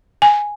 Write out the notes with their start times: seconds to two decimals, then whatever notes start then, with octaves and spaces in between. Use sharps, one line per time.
0.22 G#5